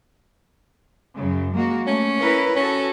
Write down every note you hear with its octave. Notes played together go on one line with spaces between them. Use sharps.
F#2 C#3
G#3 A#3 F#4
A3 C#4
E4 A#4 B4
C#4 F#4 A4